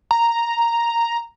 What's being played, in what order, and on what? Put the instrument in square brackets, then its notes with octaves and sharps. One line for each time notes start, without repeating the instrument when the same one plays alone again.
[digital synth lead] A#5